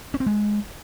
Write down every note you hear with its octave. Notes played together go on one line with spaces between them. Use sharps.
C#4
C4
G#3